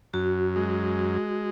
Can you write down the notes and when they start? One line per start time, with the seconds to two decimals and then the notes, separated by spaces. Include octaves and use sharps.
0.13 F#2 F#4
0.56 G#3